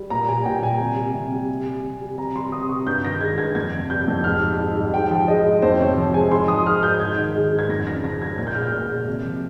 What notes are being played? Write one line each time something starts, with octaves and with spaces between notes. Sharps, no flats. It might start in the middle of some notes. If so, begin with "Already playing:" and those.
Already playing: G3
A#2 A#5
G3 G#5
A#2 G5
G3 G#5
C3
G3
C3
G3
C3
G3
C3
G3
C3 A#5
G3 C6
C3 D#6
G3 C#6
G2 G6
D#3 A#6
G#3 G#6
G2 G#6
F2 G#6
C3
G3 G6
F2
G#2 F6
G3
G#2
G3
G#2 G5
F3
G#3 D#5
G#2
F2 C5
C3 C#5
F3
G#3 G#5
G#2 C6
F3 D#6
G#3 F6
G#2 G6
G#2 G#6
D#3
G#3
G#2
G#6
F2 A#6
C#3 A#6
F3 A#6
G#3 G#6
A#2 G#6
G6
G#3 F6
G6
A#2 F6
G#3
C3
F3